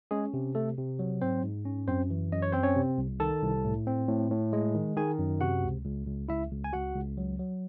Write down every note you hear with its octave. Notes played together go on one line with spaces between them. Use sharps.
G#3 C#4 G#4
C3
A3 A4
C3
F#3
G#2 C4 C5
G#2
C#4
F#2 C4 C5
E3
F#2 D#5
C#5
C4 C5
C#4 C#5
C3
C2
D#3 A4 A5
C2
A2
C4
A2
A2
G#3
D#3
D#3 G#4 G#5
F#2
C3 F#4 F#5
C#2
C#2
C#2
C#2 E4 E5
C#2
G#5
C#2 F#4 F#5
C#2
F#3
F#3